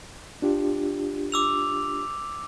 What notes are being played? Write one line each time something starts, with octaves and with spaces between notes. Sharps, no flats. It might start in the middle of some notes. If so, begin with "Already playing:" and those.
D4 F4 G4
D6 E6 F7